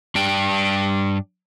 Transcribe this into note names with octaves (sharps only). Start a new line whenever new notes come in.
G2 D4 G5